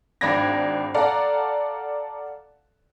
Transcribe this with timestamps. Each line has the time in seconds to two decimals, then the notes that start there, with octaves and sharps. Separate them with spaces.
0.21 G#1 D4 G5 B5 G#6 A#6
0.94 A4 D5 F5 F#5 A5 A#5